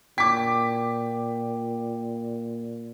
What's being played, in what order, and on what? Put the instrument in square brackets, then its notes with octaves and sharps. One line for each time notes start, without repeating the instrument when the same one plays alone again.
[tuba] A#2 [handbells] G5 [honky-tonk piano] D6 B6